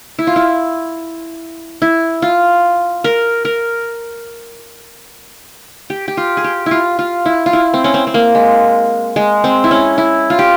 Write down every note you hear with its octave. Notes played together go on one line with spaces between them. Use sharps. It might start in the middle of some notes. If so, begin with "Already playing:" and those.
E4
F4
E4
E4
F4
A#4
A#4
G4
G4
F4
G#4
G4
E4 F4
F4
E4
F4
E4
C4
C#4
C4
C4
A#3
G#3
G#3
C4
E4
C#4
E4
F4
G4